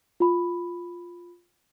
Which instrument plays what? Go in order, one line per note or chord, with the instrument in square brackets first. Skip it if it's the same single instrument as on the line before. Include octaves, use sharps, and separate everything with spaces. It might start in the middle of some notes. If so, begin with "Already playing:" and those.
[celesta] F4 B5